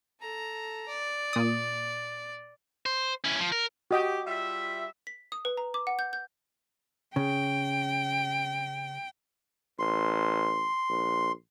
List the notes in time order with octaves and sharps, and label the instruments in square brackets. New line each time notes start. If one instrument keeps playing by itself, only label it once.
[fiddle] A4 A#5
D5
[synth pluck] A#2 D#6
[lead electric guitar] C5
C#4 E4
F3
A#4
[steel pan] F#4 D#5 D6 [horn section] G4
[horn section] G3 F4 E5
[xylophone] B6
D#6
B4
A#5
D6
F#5
G6
G6
[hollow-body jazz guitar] C#3 [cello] G5
[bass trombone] A1 [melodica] C6
[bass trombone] A#1